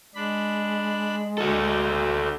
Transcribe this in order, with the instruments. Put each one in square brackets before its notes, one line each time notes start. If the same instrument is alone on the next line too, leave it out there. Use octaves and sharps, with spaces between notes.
[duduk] G#3 [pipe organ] D4 B5
[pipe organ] D2 [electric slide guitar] F#4 A4